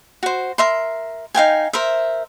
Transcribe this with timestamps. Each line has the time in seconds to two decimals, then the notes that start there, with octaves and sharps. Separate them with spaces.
0.23 F#4 C5
0.58 A#4 E5 C6
1.35 D#4 F5 G5 G#5
1.73 A#4 C5 E5